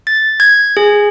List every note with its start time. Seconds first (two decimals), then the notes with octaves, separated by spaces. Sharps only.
0.07 A6
0.40 G#6
0.77 G#4